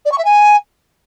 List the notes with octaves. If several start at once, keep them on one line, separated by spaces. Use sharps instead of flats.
D5
C#6
E5
G#5